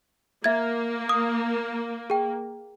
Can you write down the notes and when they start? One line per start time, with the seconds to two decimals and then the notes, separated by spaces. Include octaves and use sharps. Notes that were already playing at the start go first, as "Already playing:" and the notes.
0.44 A#3 E5 G#6
1.09 D#6
2.10 G#4 G5